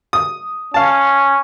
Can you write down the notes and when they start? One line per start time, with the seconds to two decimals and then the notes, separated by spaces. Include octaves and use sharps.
0.13 D#6
0.74 C#4 F5 A5